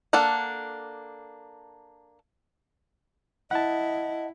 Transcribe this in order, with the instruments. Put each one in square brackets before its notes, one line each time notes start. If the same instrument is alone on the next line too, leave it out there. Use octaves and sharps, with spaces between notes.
[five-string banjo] A#3 D4 A4 F#5
[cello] E4 [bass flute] D#5 [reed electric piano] F#5 A5